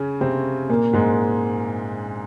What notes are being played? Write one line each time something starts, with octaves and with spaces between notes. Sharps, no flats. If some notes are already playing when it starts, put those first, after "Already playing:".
Already playing: C#3 C#4
C3 C4
A#2 A#3
G#2 G#3